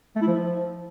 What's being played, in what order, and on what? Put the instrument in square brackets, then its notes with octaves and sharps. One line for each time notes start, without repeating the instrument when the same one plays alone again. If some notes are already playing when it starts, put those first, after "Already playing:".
[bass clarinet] A3
E4
F3